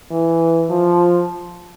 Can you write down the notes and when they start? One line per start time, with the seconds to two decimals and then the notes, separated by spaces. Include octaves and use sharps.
0.11 E3
0.70 F3